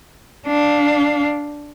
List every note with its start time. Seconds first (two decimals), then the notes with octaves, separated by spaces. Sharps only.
0.47 D4 F5